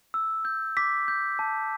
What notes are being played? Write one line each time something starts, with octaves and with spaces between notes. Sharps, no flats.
E6
G6
D6 B6
G6
A5